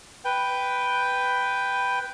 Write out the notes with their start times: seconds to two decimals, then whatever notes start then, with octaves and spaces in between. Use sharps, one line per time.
0.25 B4 G5